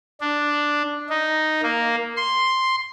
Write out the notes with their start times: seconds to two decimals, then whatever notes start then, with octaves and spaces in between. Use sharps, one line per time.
0.21 D4
1.09 D#4
1.63 A#3
2.17 C6